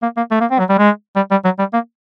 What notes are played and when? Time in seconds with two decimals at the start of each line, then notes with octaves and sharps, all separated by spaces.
0.03 A#3
0.17 A#3
0.31 A3
0.41 A#3
0.51 C4
0.59 F#3
0.70 G3
0.78 G#3
1.16 G3
1.31 G3
1.45 F#3
1.59 G3
1.74 A#3